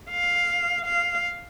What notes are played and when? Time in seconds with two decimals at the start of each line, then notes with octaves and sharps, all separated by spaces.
0.10 F5
0.86 F5